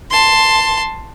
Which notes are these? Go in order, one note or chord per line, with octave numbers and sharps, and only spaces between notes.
A5 C6